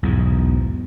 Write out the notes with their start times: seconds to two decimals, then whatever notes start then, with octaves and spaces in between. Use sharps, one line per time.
0.03 B1 E2 G#2